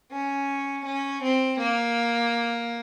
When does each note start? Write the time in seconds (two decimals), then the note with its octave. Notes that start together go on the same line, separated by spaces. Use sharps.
0.12 C#4
0.85 C#4
1.23 C4
1.60 A#3